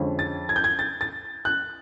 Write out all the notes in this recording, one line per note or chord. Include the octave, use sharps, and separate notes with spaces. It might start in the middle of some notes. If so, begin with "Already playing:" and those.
Already playing: F2 D3 F3 G#3 C#4
A6
G#6
G6
G#6
A6
A6
F#6